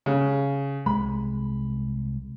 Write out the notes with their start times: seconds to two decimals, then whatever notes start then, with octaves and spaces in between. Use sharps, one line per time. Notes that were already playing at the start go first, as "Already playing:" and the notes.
0.06 C#3
0.86 C2 G#3 B5